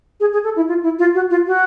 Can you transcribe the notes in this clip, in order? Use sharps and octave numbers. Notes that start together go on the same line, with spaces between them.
G#4
G#4
A4
E4
F4
E4
F4
F#4
F4
F#4